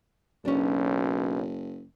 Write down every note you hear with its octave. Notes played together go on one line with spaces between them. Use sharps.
F#1 B1 C#4 D4